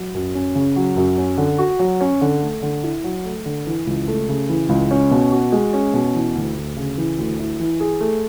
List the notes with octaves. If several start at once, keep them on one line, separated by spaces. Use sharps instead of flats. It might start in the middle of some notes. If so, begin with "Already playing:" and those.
Already playing: F#3
F#2
C#4
C#3
F#3
F#2
C#4
D3
F#4
F#3
C#4
D3
A3
D3
E4
F#3
A3
D3
E3
C#2
A3
C#3
E3
C#2
C#4
B2
F#4
G#3
C#4
B2
E3
D2
D2
C#3
E3
D2
E4
E3
G#4
A3